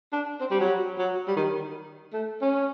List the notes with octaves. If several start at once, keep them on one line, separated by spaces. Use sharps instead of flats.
D4
C4
G3
F#3
F#3
G3
D#3
A3
C#4